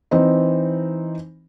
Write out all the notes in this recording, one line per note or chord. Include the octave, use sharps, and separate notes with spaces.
E3 C4 D#4